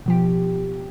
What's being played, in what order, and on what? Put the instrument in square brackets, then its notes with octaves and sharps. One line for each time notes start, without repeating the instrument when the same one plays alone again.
[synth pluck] B2 F3 G4